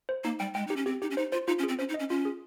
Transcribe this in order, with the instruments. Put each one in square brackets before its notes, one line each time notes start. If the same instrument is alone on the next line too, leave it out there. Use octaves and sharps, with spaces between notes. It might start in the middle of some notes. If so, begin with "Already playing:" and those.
[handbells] C5
[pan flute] A#3 [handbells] D#4
[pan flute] G3 [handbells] G5
[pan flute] G#3 [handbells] G5
[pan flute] D#4 [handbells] G4
[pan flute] C#4
[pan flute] C4 [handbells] G4
[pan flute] D#4 [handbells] G4
[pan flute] C#4
[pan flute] D#4 [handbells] C5
[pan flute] F4 [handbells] C5
[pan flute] D#4 [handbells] F4
[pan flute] C#4
[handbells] G#4
[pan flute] C4
[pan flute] C#4 [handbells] C5
[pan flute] D#4
[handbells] D#5
[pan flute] C#4
[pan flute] C#4 [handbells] F4
[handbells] G#4